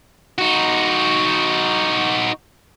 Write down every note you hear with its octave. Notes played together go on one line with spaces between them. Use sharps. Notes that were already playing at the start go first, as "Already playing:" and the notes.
D#4 F#4